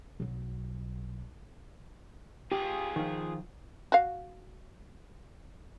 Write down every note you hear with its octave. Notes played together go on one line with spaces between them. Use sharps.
B1 F#3
F4 G4 G#4
D#3 F3
F#4 F5